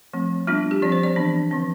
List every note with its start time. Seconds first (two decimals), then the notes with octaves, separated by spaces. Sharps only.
0.13 F3 A3 C4
0.47 G3 B3 D4 F4
0.71 G4
0.82 F3 C4 D5
0.92 C5
1.03 D5
1.16 E3 B3 D4
1.51 D3 F3 C4